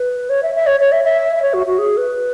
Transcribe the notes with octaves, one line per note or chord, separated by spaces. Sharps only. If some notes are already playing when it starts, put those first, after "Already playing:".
Already playing: B4
C#5
E5
E5
C#5
C#5
E5
E5
E5
C#5
F#4
F#4
G#4
B4